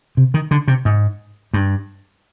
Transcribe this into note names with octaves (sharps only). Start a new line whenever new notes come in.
C3
D#3
D3
C3
G#2
G2